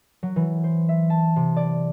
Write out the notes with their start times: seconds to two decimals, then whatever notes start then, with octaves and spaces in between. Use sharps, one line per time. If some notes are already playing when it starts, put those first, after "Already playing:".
0.23 F#3
0.36 E3
0.64 C5
0.89 E5
1.10 A5
1.36 C3
1.56 D5